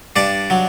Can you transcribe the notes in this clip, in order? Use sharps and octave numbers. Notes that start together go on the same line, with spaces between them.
G2 D4 D5
F#3